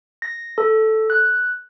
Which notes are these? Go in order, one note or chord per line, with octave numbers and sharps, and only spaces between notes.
A#6
A4
F#6